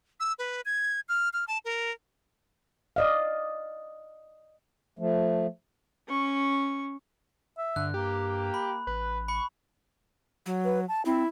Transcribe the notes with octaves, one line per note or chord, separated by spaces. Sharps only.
E6
B4
G#6
F6
F6
A5
A#4
D5 D#5 F5
F3 A3
C#4 C#6
E5
G2 D3 F#6
A#3 G4
B5
A1 B4
B5 C#6
F#3
B4
A5
C4 E4